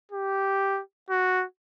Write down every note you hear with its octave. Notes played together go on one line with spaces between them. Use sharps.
G4
F#4